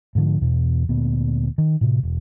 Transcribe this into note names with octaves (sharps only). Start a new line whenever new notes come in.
G#2 D3 F3
E2 B2
D2 A#2 B3
D#3
A2 C3
E1